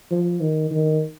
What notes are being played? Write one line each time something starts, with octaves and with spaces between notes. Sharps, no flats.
F3
D#3
D#3